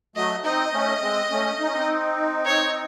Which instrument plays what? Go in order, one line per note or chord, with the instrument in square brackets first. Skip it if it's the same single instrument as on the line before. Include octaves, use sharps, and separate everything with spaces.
[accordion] F#3 A3 [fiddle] D#5
[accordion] C4 D#4 [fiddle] D#5
[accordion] A3 C#4
G#3 C4
A3 C#4
D#4
C#4
C4 D#4
[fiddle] C#5